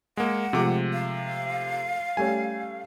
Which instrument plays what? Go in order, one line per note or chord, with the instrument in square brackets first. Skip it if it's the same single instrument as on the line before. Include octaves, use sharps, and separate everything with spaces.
[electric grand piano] G#3 A#3 [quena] F#5
[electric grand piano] C3 D6 [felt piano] F3 G#3 A3
[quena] F5
[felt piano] G3 A3 C#4 [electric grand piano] G#5